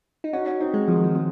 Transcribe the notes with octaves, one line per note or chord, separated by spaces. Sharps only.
D#4
C#4 F#4
C#4
C4 D#4
G#3
F3 G#3
D#3
F3
F3 G#3